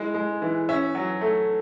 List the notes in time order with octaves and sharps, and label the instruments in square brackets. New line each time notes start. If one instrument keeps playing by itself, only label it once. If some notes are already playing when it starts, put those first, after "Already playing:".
Already playing: [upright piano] G#3 E4
G#3
E3
C#4 E5
F#3
A3